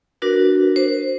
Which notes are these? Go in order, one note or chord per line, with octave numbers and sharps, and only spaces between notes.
D4 F#4 A#4 B4
C5